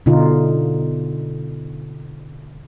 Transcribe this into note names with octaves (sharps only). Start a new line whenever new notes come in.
B2 D3 D#4 F4